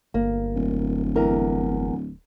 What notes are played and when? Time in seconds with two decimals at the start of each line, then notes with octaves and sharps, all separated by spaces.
0.14 G1 A#3
0.55 D1
1.16 E2 A#4